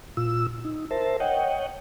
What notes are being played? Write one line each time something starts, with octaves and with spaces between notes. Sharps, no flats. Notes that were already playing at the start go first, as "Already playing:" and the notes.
A#2 F4 E6
D#4
A#4 C5 E5 A5
C#5 D#5 F#5 G5